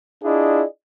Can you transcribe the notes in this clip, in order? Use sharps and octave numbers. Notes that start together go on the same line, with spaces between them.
D4 E4 F4 G#4 D5 D#5